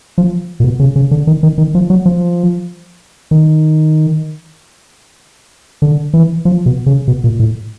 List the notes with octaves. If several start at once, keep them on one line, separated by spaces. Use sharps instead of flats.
F3
A#2
B2
C#3
C#3
D3
D#3
D#3
D#3
F3
F#3
F3
D#3
D3
E3
F3
B2
C#3
B2
A#2
A2